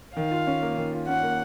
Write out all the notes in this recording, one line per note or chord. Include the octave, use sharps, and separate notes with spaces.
D#3 F5
F4
C#4
A#3
D#3
F4
C#4 F#5
A#3